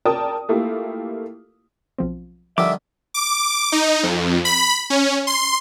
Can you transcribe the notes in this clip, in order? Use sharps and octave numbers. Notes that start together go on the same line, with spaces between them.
A#4 D5 G5 A5 D#6
A3 A#3 E4 F4 G4
B1 F3 C4
D3 D#3 F3 G3 E5 D6
D6
D#4
F2
B5
C#4
C6